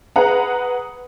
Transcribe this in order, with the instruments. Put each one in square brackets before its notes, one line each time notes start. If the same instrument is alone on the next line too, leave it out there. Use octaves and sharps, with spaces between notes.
[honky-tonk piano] G#4 B4 F#5 A#5